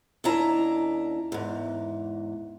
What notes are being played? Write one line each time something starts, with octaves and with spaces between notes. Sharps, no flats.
D#2 C#4 D4 E4 A#5
E2 G#2